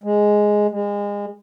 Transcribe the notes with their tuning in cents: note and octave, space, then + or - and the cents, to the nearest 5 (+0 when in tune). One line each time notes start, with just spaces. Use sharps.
G#3 +0
G#3 -30